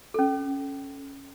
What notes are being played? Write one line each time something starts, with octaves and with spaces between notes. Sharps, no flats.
C#4 A4